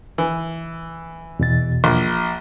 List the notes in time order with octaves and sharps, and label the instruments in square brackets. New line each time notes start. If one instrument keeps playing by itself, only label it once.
[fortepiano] E3
[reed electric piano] E2 B2 A6
[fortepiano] A#1